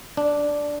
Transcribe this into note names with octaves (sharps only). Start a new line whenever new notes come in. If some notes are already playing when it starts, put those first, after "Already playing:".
D4